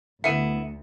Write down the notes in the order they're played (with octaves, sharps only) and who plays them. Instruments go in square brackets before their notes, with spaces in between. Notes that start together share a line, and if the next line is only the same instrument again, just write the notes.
[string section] D2 [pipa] B3 E4 [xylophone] E5 [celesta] C#7 D#7